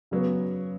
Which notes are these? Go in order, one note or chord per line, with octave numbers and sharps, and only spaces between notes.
C#3 F#3 B3